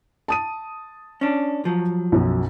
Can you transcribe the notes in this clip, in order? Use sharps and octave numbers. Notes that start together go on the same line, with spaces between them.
A5 D#6 D#7
C#4 D4
F3 F#3
B1 F#2